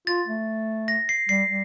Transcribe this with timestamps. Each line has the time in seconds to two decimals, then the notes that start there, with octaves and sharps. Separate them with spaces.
0.07 F4 A6
0.27 A3
0.88 A#6
1.09 C7
1.29 G3 C7
1.49 G3